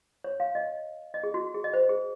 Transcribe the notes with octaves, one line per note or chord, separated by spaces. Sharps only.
C#5
F5
D#5
D#5
G#4
F#4
G#4
D#5
C5
G#4